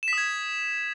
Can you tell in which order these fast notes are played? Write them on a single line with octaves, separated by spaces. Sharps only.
E7 B6 D#6 G#6